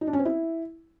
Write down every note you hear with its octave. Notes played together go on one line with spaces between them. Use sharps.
D#4
D4
C#4
C4
E4